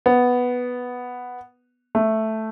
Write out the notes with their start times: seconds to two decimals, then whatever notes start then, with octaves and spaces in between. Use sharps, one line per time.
0.06 B3
1.95 A3